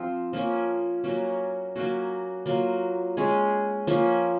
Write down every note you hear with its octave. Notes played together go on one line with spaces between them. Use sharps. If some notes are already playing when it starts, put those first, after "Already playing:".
Already playing: F3 C4 F4
F3 A#3 C#4
F#3 A#3 C#4
F#3 A#3 C#4 F#4
F#3 A#3 F4
G#3 C#4 G#4
F3 A#3 C#4